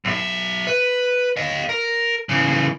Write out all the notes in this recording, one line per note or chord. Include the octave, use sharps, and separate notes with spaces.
B1 E5
B4
D#5 F5
A#4
C#3 E3